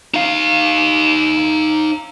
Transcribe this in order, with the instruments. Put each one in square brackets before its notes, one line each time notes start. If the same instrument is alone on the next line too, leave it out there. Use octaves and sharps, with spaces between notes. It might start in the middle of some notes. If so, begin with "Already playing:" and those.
[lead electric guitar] D#4 F5